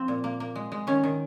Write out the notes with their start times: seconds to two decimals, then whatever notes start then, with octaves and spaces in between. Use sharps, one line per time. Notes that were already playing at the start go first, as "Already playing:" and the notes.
Already playing: F3 C4
0.08 A#2
0.24 A#3
0.40 A#3
0.56 G#3
0.72 G#3
0.87 D#3 C#4
1.03 D#3